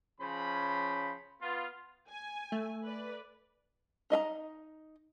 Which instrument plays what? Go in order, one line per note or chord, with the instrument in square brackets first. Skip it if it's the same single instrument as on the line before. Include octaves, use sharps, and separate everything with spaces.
[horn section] C#3 F3 C#4 C5 B5
B3 F4
[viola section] G#5
[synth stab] A3
[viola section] B4 D5
[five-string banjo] D#4 D#5 E5 A#5